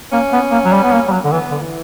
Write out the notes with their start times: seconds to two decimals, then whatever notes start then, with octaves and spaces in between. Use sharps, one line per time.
0.12 A#3 C#4
0.33 B3
0.52 A#3
0.65 F#3
0.73 G3
0.83 B3
0.92 A#3
1.08 G3
1.12 F#3
1.24 D3
1.32 E3 B3
1.51 D3
1.62 E3